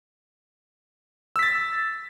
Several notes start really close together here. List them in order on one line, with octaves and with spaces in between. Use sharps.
E6 B6 A6